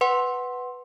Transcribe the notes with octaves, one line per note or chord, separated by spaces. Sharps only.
B4 F#5 C6